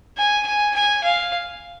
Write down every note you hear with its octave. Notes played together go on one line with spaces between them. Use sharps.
G#5
G#5
G#5
F5